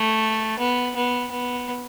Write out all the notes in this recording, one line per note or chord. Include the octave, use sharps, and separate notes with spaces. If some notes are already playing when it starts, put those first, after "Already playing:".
Already playing: A3
B3
B3
B3